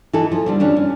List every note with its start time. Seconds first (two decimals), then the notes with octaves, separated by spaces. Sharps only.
0.13 E3 D#4 E4 A4
0.32 F3
0.46 D3 F3 G3
0.60 E3 C#4 D4
0.77 C#4